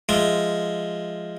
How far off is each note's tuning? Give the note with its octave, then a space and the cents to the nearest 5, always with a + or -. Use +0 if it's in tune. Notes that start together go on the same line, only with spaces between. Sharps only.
F3 -5 G#3 +0 E5 +0